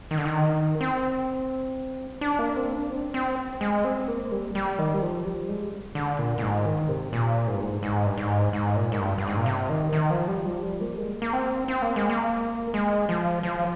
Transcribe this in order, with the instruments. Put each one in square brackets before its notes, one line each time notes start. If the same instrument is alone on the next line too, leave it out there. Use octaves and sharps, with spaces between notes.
[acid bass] D#3
D3
D#3
C4
D4
A#3
C4
D4
C4
C4
G#3
C4
A#3
G3
G3
D#3
G3
F3
G3
G#3
D3
A#2
A#2
G#2
D#3
C3
A#2
G#2
G2
G#2
G#2
G2
G#2
G#2
A#2
G#2
G2
G2
G#2
A#2
C3
D#3
D#3
F3
G3
F3
G3
A#3
G#3
A#3
C4
C4
A#3
G#3
A#3
G#3
F3
F3